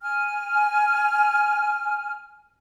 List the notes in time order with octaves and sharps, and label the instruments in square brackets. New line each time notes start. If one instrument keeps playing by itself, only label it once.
[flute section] G#5 F6